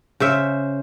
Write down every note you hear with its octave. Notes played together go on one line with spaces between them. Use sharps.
C#3 C5 E5